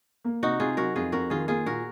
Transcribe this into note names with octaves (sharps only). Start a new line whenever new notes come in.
A#3
C3 D#4 F#4
C3 F4 G#4
F#3 F#4 A#4
F2 F4 G#4
F2 F#4 A#4
D#3 F4 G#4
A#3 F4 G#4
A#2 F#4 A#4